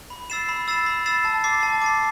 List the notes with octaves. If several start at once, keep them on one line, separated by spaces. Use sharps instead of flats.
B5
E6 A6 C7 E7
B5
E6 A6 C7 E7
B5
E6 A6 C7 E7
A5
D6 A6 C7
A5
D6 A6 C7